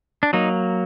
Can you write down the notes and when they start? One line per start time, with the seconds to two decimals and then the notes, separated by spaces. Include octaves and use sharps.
0.23 D4
0.33 F#3 A#3 D#4